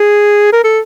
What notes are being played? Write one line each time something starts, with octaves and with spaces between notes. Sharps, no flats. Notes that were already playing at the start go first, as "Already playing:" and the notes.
Already playing: G#4
A#4
A4